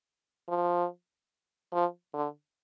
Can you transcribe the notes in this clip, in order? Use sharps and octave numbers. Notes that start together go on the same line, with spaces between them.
F3
F3
D3